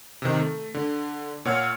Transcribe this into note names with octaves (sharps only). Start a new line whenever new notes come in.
C3 D#3
A3
D3
A#2 C#5 F#5 F6 G#6 C#7